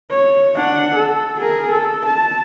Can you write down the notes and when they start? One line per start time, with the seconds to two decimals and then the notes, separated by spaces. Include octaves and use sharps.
0.11 C#5
0.55 D4 F#5
0.95 A4
1.40 G#4 A#4
1.71 A4
2.06 A5